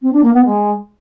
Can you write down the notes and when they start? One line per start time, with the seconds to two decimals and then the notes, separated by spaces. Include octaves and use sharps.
0.02 C4
0.13 D4
0.23 A#3
0.34 B3
0.44 G#3